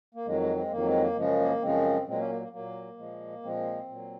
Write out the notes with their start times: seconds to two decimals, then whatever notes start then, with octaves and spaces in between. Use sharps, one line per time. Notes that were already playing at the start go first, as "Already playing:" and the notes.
0.14 A#3
0.25 F2 D#3 F#3 G#3
0.41 G#3
0.56 G#3 C4
0.71 F2 D#3 F#3 A#3
0.86 G#3 C4
1.01 A#3
1.16 F#2 C#3 F3 G#3
1.39 A#3
1.62 F#2 C#3 F3 G#3 C4
2.07 A#2 F#3 G#3 C4
2.18 A#3 C#4
2.30 A#3
2.41 A#3
2.52 A#2 F#3 A#3
2.98 A#2 F3 G#3
3.43 A#2 F3 G#3 C4
3.89 A#2 F#3